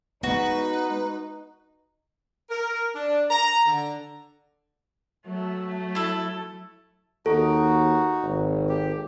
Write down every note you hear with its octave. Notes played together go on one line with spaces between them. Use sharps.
G#3 B3 D#4 F#4 B4
A#4
D4
A#5
D3
F#3 A3
E4 A4
D#2 D#4 F#4 A4
G#1
G4